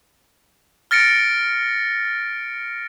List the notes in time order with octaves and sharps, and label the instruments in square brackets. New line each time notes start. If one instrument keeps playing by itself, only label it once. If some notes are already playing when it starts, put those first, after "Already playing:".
[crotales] F6 A6 A#6 C#7 D7